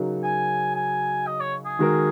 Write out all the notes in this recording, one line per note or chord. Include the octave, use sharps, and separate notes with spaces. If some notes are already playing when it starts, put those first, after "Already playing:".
Already playing: C#3 F#3 D#4 F#4 A#4
G#5
G#5
D#5
C#5
G#4
D#3 G#3 F#4 A#4